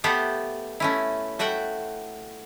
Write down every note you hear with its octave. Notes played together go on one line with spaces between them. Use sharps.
A3 B3 G4 A4 C5 F#5
A3 C#4 E4
A3 F#4 E5 F#5 G5